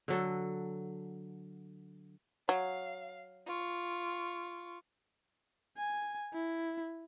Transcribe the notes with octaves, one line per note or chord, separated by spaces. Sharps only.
D3 F#3 A4
F#3 F5
F4 C#6
G#5
E4